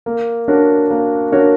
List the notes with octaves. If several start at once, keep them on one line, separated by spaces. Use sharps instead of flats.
A#3
D4 F#4 A#4 C#5
A#3
D4 F#4 A#4 C#5